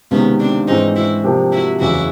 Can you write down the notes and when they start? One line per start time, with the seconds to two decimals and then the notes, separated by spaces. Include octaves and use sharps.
0.11 C#2 C3 D#3 B3 C#4
0.39 C4 D4
0.67 G#2 E3 G#3 C4 C#4 D#4
0.96 E4 F#4
1.24 C3 F3 A#3 D4 G4
1.52 E4 F#4
1.80 F#1 E2 C#3 E3 E4 F#4